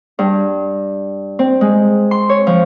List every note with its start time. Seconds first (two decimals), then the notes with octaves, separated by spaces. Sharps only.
0.19 G2
1.39 C4
1.61 G#3
2.11 C6
2.29 C#5
2.47 F3